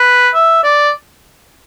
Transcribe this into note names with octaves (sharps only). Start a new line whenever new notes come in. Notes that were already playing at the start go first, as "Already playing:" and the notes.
Already playing: B4
E5
D5